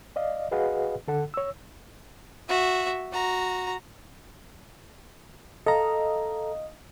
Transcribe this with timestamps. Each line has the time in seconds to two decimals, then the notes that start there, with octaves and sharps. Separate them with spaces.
0.16 D5 D#5 F5
0.51 F#4 G#4 B4 D#5 F5 F#5
1.08 D3 A4 F#5
1.34 C#5 E6
2.49 F#4 E5
3.12 F#4 A#5
5.66 A4 D#5 F5 A#5